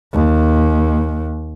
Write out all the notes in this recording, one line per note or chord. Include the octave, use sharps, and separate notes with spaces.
D#2